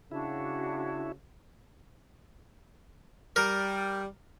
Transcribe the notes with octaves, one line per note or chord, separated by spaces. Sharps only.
C#3 D4 E4 F#4
G3 A#4